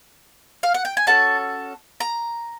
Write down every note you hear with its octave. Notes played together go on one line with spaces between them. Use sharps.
F5
F#5
G5
G#5
C#4 F#4 A4 A5
A#5